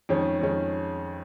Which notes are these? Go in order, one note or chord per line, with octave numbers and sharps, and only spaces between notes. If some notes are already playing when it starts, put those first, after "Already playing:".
F2 D#3 G#3 C#4
F2 D#3 G#3 C#4